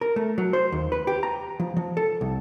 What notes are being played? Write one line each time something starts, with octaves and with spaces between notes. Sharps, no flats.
A#4
A3
F#3
C5
D#2
B4
G4
A#5
F3
F3
A4
C2